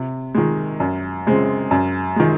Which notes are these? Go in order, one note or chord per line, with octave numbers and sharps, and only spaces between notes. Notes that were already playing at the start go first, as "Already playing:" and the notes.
Already playing: C3
D#3 G#3
F#2
C#3 G#3 C4
F#2
D#3 G#3